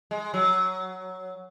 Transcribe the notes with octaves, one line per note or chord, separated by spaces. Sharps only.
G#3
F#3